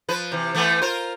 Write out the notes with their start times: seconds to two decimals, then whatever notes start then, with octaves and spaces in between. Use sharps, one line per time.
0.09 F3 B4
0.32 C3 E3
0.55 E3 A3 B3
0.82 F4 A#4 C5